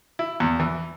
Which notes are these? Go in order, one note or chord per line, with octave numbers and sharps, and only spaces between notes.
E4
E2
E3